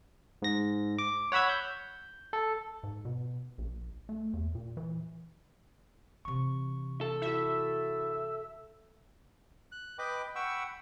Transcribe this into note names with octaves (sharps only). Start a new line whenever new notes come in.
G#2 A#6
D6
C#5 F#5 B5 E6 G#6
G6
A4
G#2
B2
A#1
A3
E2
A#2
E3
C3 E3 C#6
A4
E4 F#4 E5
F#6
B4 D#5 G5 B5 D6
F#5 G5 B5 C#6 E6